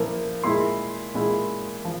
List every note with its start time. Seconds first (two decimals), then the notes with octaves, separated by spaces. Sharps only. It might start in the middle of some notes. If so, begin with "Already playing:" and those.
Already playing: A#2 F3 A#3 E4
0.44 A#2 G#3 E4 C6
1.14 A#2 G#3 E4
1.85 F3